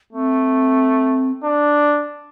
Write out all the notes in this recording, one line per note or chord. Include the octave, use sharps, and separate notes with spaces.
A3 C4
D4